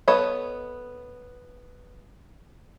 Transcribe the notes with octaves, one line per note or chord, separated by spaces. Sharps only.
B3 A4 C#5 D#5 B5